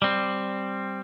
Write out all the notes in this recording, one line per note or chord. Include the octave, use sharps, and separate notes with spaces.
G3 C4